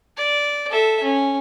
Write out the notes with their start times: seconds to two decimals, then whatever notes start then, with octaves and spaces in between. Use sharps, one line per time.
0.17 D5
0.70 A4 E5
1.03 C#4